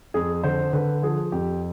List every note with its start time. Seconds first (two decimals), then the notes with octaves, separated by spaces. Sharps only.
0.14 F2 G#4
0.44 D3 C5
0.73 D3 B4
1.03 F3 G#4
1.32 F2 G4